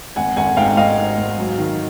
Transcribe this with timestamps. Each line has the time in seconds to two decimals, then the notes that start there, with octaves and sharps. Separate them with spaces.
0.16 G#1 F#5 G#5
0.37 G#1 F#5 G#5
0.57 G#2 F5 G5
0.77 G#2 D#5 F5
0.98 G#2
1.18 G#2
1.38 F#3
1.59 D#3